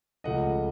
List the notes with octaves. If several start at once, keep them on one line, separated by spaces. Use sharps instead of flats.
C#2 C#3 F3 A3 D#5 F#5